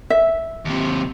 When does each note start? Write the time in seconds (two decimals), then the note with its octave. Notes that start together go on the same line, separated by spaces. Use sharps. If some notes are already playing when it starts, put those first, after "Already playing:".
0.10 E5
0.65 D#2 C3